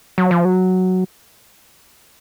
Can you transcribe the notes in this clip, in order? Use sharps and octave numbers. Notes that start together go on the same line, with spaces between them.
F#3
F3
F#3